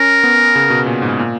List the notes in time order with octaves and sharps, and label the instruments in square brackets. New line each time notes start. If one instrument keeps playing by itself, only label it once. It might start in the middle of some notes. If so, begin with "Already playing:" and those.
Already playing: [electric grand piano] C#4 [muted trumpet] A#4
[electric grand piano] B3
C#3
B2
A#2
G#2
A#2